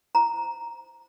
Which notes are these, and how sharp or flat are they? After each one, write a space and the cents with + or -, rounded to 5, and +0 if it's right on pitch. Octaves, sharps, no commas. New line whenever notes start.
C5 +0 A#5 +0